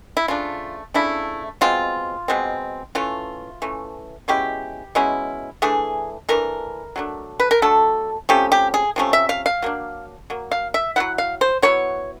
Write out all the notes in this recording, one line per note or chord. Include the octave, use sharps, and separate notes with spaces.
E4
C#3 F3 A3 D4 F4
C#3 F3 A3 D4 E4
B2 G#3 C4 F4
B2 G#3 C4
E3 A3 C#4 F4
E3 A3 C#4
B2 G#3 C#4 E4 G4
B2 G#3 C#4 E4
E3 A3 D4 G#4
E3 A3 D4 A#4
F#3 A3 D4
B4
A#4
F#3 A3 D4 A4
C3 F3 A3 C#4 G4
G4
G#4
C3 F3 A3 C#4
E5
F5
F5
F#3 A#3 D4
F#3 A#3
F5
E5
F#3 B3 E4 F#5
F5
C5
F#3 B3 E4 C#5